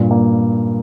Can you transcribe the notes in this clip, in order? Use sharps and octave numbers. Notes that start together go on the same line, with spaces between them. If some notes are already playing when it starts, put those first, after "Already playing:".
Already playing: G2 A#2
A#3